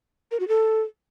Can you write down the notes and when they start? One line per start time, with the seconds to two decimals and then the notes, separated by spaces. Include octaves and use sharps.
0.31 A#4
0.40 F#4
0.48 A4